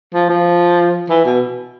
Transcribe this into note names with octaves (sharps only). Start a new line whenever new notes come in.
F3
F3
E3
B2